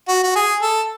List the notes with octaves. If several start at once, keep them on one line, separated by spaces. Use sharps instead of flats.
F#4
F#4
G#4
A4